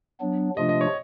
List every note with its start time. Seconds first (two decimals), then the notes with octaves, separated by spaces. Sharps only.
0.21 F#3 B3 D4
0.57 C3 F3 A3 D4 F4 D#5
0.69 D#5
0.81 C#5